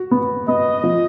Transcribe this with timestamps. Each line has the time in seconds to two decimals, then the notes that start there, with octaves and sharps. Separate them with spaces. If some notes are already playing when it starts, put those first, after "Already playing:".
Already playing: F#4
0.11 B3
0.48 B3 D#5
0.84 F3